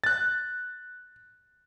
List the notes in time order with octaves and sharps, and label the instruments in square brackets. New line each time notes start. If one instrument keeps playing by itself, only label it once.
[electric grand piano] F#6 A6